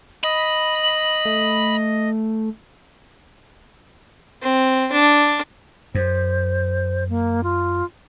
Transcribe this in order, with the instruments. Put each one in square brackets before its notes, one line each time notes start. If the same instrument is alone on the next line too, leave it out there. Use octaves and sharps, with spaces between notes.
[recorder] D#5 [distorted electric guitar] B5
[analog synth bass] A3
[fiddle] C4
D4
[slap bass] F#2 [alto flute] C5
[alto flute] A#3
F4